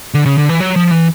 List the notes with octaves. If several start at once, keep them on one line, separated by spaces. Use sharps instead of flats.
D3
C#3
D3
E3
F#3
F3
E3